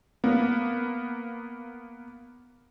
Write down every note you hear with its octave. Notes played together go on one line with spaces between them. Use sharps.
A#3 B3